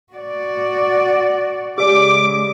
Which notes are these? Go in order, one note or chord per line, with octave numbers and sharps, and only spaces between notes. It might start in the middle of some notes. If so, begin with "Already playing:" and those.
F#4 D5
C#3 G#3 G4 D5 D6